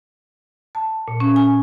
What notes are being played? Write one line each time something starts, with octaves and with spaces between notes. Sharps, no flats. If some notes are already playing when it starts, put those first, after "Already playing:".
A5
A#2
C#4
G#5